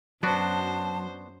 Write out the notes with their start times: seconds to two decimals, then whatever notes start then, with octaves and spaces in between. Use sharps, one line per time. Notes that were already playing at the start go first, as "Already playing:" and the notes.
0.23 F#2 F#3 B3 D4 F#4 C5 A5